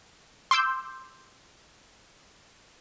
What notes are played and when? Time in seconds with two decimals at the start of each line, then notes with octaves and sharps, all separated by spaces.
0.51 C6 D6 E6 G6